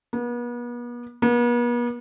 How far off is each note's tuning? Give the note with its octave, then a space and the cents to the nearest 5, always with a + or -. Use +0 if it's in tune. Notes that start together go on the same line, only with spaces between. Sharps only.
B3 -40
B3 -45